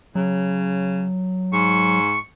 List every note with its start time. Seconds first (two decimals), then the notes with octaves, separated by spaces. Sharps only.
0.15 C#3 F#3
1.53 G#2 C#6